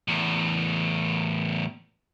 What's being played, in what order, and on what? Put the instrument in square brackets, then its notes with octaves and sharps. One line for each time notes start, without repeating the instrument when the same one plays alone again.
[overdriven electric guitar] E2 A2